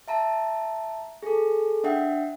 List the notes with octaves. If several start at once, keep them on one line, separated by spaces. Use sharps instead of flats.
E5 A5 A#5
G#4 A4
D4 E5 F#5 G5